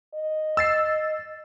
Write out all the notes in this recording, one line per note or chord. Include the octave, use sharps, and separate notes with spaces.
D#5
E6 A6 C7